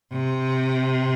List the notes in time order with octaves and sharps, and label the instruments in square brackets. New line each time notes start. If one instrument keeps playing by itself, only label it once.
[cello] C3